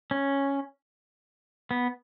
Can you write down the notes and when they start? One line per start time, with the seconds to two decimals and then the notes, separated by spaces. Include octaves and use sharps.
0.11 C#4
1.71 B3